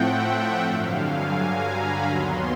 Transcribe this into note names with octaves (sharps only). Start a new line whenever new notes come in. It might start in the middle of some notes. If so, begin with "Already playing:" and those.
Already playing: A2 F3 A3 C4 E5 F#5 G5
E5
G2 D3 F#3 F5
G#5
A#5
B5
D#2 D#3 F#3 B3 C6